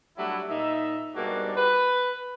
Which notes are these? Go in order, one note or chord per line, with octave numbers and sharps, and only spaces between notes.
F#3 G3 A3 D4 E4
A#2 D#4 E5
G#2 B2 G3 A#3 D4 F#4
B4